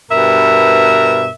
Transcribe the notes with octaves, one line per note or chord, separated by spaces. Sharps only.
G2 B2 A#4 E5